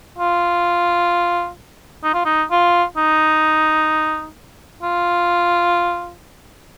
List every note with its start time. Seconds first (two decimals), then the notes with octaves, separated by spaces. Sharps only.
0.18 F4
2.04 D#4
2.14 F4
2.25 D#4
2.51 F4
2.97 D#4
4.83 F4